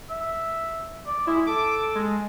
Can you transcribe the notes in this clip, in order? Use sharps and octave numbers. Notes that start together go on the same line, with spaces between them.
E5
D5
G#3 E4
A4 D6
G#3